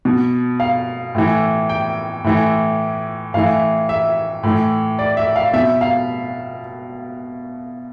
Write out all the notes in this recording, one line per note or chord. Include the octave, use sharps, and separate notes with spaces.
B2
F5
A2 E3
G5
A2 E3
A2 E3 F5
E5
A2 E3
D5
E5
F5
B2 E5
F5